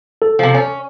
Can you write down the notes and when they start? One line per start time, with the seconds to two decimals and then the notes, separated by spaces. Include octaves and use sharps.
0.22 A4
0.39 C3 F3
0.54 C#4